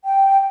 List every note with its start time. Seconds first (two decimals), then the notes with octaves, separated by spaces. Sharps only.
0.05 G5